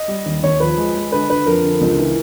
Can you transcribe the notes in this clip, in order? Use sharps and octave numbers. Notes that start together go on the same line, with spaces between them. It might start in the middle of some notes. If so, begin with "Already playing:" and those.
Already playing: D#5
G3
D#2
D#2 C#5
F3 B4
G#3
G#3
D3 B4
D3 B4
F2 A#4
D3
C#2
E3